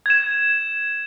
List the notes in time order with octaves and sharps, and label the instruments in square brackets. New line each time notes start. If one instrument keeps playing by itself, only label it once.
[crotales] G#6 E7